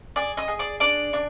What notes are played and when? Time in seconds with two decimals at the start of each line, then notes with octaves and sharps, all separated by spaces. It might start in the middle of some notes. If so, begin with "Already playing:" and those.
0.16 G#4 D5 D6
0.37 D#5 D#6
0.48 G#4
0.59 D5 D6
0.80 D4 D5 D6
1.13 D4